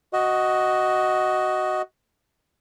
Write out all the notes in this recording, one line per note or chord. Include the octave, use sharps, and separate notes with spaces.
F#4 D#5